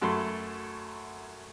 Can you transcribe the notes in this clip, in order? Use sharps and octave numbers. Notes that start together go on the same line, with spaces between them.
F#2 F#3 A3 A4 B5 C6